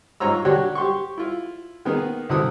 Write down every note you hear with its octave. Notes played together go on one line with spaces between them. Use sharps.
G#2 F4 C#5 A#5 E6
D3 D4 F#4 G4 C#5
G4 C6 C#6
E4 F4
D#3 A#3 B3 G#4
C2 D3 E4 D#6 E6